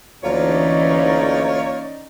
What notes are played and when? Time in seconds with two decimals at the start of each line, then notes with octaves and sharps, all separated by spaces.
0.24 D2 E3 A#3 C#4 D#4 F4 C#5 D5